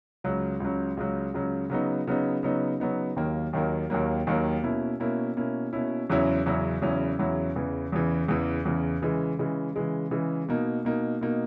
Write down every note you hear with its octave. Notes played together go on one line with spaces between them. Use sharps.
C#2 C#3 F#3
C#2 C#3 F#3
C#2 C#3 F#3
C#2 C#3 F#3
C#3 F#3 B3 D#4
C#3 F#3 B3 D#4
C#3 F#3 B3 D#4
C#3 F#3 B3 D#4
D#2 D#3 F#3 A#3
D#2 D#3 F#3 A#3
D#2 D#3 F#3 A#3
D#2 D#3 F#3 A#3
B2 A#3 C#4 E4
B2 A#3 C#4 E4
B2 A#3 C#4 E4
B2 A#3 C#4 E4
E2 C#3 F#3 C#4 E4
E2 C#3 F#3 C#4 E4
E2 C#3 F#3 C#4 E4
E2 C#3 F#3 C#4 E4
E2 C#3 E3
E2 C#3 E3
E2 C#3 E3
E2 C#3 E3
C#3 E3 G#3
C#3 E3 G#3
C#3 E3 G#3
C#3 E3 G#3
B2 A#3 D#4
B2 A#3 D#4
B2 A#3 D#4